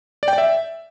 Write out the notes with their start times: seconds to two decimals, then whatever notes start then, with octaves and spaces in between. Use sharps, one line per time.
0.23 D5
0.28 G5
0.33 D5
0.38 E5